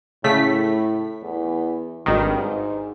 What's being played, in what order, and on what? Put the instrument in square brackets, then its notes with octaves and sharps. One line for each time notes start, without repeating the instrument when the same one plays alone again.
[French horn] A2 [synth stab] C#3 A3 B6
[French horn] E2
[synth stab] G#1 D#3 [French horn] G2
[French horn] G#2